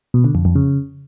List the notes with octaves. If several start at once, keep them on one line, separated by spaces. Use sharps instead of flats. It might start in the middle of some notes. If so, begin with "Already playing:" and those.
B2
D3
F2
F2
C#3